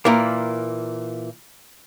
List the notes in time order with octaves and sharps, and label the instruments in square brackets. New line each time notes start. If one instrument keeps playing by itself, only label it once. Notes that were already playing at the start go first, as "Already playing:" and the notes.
[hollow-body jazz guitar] A#2 E3 A#3